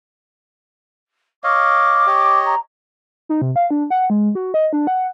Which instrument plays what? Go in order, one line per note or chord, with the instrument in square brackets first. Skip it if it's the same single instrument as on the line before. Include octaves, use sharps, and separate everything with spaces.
[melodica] C#5 D#5 F5 [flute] D6
[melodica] G4 C#5 D#5
[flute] A#5
[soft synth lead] D#4
C3
F5
D4
F#5
G#3
F#4
D#5
D4
F#5